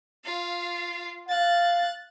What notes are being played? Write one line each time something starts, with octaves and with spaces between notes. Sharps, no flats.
F4 F5
F5 F#6 A6